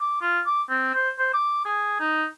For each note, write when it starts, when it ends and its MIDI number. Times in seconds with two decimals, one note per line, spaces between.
0.01 0.19 86
0.21 0.40 65
0.47 0.63 86
0.70 0.90 60
0.94 1.10 72
1.19 1.32 72
1.34 1.61 86
1.65 1.95 68
2.00 2.26 63